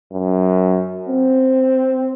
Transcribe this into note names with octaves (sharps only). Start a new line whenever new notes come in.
F#2
C4